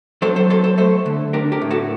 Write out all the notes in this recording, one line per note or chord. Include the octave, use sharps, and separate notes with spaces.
F#3 A4 C5
A4 C5
F#3 A4 C5
A4 C5
A3 A4 C5
D3
D4 G4 A#4
G4 A#4
A2
F#4 A4